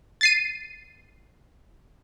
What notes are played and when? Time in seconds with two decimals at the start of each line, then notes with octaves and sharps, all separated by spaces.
0.21 A6 C7 D#7